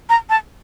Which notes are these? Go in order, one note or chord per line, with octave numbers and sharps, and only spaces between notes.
A#5
A5